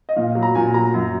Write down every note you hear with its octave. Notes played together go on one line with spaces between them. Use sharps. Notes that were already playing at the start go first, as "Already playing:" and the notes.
D#5
A#2 F5
F#3
A#5
A#2 G#5
F#3 A#5
F#2